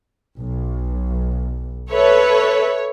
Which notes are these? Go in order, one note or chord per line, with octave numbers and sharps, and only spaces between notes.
B1
A4 B4 C#5 E5